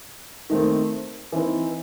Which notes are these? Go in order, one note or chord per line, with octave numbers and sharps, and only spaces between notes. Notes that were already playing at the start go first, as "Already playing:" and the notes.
D#3 A3 C4
E3 C4 D#4